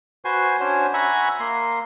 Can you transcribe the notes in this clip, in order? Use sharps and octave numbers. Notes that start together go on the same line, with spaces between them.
F#4 B4 C5 G#5 C6
C#4 D4 F#4 C5 C#5
E5 F#5 G#5 A#5 B5 C#6
A#3 C6